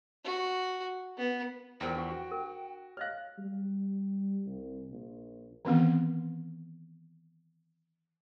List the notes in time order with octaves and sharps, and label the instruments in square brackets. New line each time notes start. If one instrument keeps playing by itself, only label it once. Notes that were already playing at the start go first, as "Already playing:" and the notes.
[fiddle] F#4
B3
[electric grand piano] E2 F3 [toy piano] A#4 C5 E5 [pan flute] G5
[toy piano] D4 F#5 C#6
[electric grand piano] F#4
[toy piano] A#4
[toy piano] C#5 D#5 F5 [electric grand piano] F6 F#6
[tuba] G3
C2
A#1
[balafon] D#3 E3 B3 C4